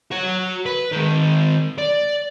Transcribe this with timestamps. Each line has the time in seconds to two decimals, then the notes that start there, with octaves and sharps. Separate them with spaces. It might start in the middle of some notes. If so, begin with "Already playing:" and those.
0.11 F#4 C#5
0.66 B4
0.92 D#3 G#3
1.78 D5